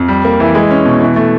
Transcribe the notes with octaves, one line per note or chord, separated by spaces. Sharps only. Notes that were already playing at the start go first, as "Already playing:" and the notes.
Already playing: F2
G3
A#3
E3
G#3
C#4
B2
E3
A3